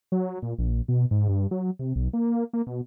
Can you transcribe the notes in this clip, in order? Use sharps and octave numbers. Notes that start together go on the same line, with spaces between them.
F#3
A#2
A#1
B2
G#2
G2
F#3
C3
B1
A#3
A#3
B2